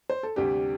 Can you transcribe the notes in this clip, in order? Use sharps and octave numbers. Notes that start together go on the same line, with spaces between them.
C5
A4
D2 C3 G3 G4